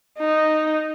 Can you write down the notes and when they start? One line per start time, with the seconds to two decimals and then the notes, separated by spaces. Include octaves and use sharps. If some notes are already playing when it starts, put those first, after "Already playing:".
0.19 D#4